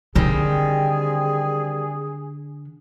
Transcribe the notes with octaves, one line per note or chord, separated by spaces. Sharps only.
D3 D#3 G3 C4 G#4